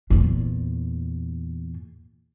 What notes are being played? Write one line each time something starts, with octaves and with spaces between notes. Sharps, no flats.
E2 A#2